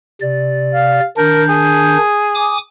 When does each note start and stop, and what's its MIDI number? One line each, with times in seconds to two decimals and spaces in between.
0.22 1.00 48
0.22 1.00 74
0.74 1.04 77
1.17 1.98 51
1.17 1.98 62
1.17 1.43 70
1.17 1.98 91
1.49 2.57 68
2.35 2.58 80
2.35 2.58 86
2.35 2.58 87